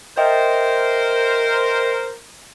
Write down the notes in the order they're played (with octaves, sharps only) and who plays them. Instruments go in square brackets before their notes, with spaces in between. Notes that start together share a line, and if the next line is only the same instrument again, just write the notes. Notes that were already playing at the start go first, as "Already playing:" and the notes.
[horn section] A#4 C5 [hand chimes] D#5 E5 G5